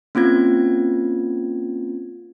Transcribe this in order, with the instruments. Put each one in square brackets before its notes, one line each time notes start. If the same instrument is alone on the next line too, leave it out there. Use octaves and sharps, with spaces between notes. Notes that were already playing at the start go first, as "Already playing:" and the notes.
[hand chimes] A#3 C4 C#4 F4 G#6